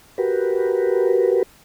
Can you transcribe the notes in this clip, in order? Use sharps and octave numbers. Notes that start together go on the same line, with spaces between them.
F#4 G4 A#4 B4